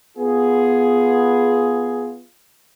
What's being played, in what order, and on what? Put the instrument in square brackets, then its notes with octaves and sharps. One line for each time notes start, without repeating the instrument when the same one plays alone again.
[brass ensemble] B3 F4 G#4